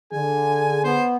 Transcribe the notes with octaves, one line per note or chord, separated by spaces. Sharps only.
D3 G#4 G#5
B3 C5